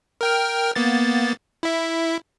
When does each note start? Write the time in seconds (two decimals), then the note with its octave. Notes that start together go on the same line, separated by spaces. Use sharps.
0.21 A#4 G5 F6
0.76 A#3 B3 A6
1.63 E4 E5